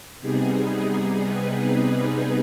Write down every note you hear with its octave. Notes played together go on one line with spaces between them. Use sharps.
C3 G3 B3 D#4 G#4
B4
G#4